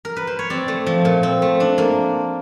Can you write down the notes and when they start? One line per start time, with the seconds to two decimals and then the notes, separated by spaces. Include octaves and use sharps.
0.05 A#4
0.16 B4
0.27 C5
0.39 C#5
0.50 C4 D5
0.68 A3
0.86 F3
1.05 A#2
1.23 C4
1.42 A3
1.60 D4
1.78 A#3